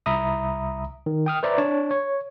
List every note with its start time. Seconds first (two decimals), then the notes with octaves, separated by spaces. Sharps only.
0.06 C2 E5 A#5 B5 D#6
1.06 D#3
1.26 G5 D#6 F6
1.43 B4 C5 D5 E5 A#5
1.58 D4 C#5 A5
1.91 C#5